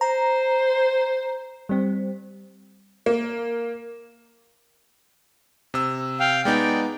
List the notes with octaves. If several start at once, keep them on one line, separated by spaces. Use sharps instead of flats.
C5 A#5
G3 C4
A#3
C3 E6
F5 G5
G#3 B3 D#4 D5 G5